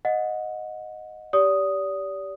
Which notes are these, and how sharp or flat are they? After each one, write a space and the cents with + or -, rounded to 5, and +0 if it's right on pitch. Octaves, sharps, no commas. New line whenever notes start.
D#5 +0 F#5 -25
G4 +0 D5 -35 D#6 +0